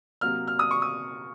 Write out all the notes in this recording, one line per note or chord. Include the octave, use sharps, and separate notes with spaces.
C3 F#3 A#3 F6
F6
D#6
C#6
D#6